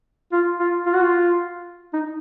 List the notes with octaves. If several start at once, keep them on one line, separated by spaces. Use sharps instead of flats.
F4
F4
F4
F#4
F4
D#4